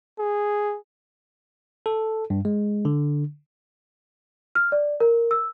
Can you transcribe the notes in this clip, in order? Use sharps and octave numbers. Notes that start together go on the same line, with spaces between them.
G#4
A4
G2
G#3
D3
F6
D5
A#4
E6